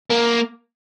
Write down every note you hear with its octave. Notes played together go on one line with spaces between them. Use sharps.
A#3